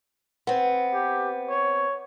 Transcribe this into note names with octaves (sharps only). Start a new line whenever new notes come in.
B3 C4
G4
C#5